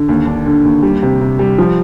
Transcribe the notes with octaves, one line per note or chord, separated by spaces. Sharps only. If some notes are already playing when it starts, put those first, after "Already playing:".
Already playing: D3
D#2
D4
D3
D#2
G3
C3
C3
G3
F3